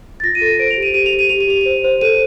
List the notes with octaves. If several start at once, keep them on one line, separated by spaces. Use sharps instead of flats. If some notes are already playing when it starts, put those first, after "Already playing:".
A6
F4 A#6
D#7
A4
C5 D7
F7
G4
D#7
G4 D#7
F7
G4
D#7
G4 F7
D#7
G4 F7
C5 D#7
C5
A4 D#7